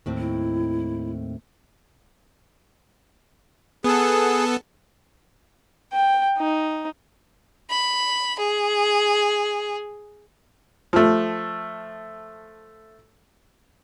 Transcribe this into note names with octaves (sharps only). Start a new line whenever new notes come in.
D#2 A2 C4
E4
B3 G#4 A4
G5
D#4
B5
G#4
F3 A3